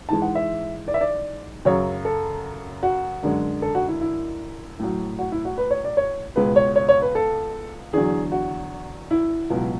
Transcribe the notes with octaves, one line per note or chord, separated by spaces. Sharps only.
G#2 E3 G#3 A5
F#5
E5
D5
E5
D5
F#2 C#3 F#3 C#5
A4
F#4
F#2 D3 G#3
A4
F#4
E4
E4
A2 F#3
F#4
E4
F#4
B4
C#5
D5
C#5
C#2 B2 G#3 B4
C#5
C#5
C#5
B4
A4
E2 D3 F#3 G#4
F#4
E4
C#2 B2 F#3